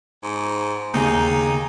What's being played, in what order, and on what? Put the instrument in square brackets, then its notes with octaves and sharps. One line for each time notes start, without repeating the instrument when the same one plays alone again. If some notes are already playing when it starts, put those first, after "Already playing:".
[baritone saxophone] G#2
[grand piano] D#2 G#4 [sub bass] C#3 [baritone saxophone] D#4